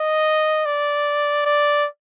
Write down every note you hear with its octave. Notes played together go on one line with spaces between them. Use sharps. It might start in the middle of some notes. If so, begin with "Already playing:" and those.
Already playing: D#5
D5
D5